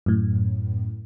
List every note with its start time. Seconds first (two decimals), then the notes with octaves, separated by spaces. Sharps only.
0.06 F#2 A2